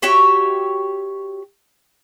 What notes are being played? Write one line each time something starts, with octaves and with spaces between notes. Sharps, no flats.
F#4 G4 C#5 E5